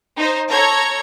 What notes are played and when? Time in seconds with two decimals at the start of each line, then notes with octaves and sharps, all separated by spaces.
0.17 D#4 C5
0.50 A4 C#5 A#5 G#6